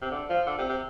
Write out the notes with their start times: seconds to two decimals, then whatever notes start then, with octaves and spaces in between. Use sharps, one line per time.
0.02 C3
0.11 D3
0.29 F3
0.47 D3
0.58 C3
0.69 C3